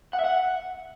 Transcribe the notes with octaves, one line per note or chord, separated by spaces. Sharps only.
F#5
E5
F#5